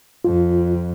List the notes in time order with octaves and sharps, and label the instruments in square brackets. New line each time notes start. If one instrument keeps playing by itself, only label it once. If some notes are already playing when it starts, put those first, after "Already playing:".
[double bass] F2 [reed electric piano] F4